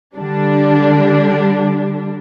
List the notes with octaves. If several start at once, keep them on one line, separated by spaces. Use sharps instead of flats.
D3 G3 D4